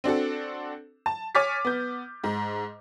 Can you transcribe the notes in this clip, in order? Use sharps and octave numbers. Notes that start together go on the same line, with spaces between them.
C4 D4 F#4 A4
A5
C#5 G#5 D6 F6 A6 B6
B3 G6
G#2